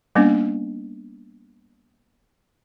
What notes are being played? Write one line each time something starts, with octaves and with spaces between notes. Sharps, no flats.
G3 A#3 B3 C#4 D4